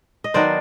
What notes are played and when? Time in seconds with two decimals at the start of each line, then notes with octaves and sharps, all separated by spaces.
0.24 D#5
0.34 D#3 F#3 B3 D4 C5 D5